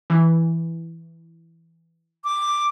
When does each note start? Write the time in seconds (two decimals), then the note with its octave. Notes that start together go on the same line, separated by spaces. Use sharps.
0.10 E3
2.24 D6